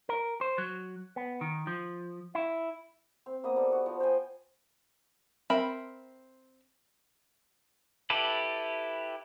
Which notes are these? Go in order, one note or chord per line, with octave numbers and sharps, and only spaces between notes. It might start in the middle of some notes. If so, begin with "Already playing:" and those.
A#4
C5
F#3
B3
D#3
F3
E4
C4
A#3 B3 D#5
G3 A4
F#4
F3
C5 G5 G#5
C4 A#4 E5 B5
E4 G4 A4 B4 D5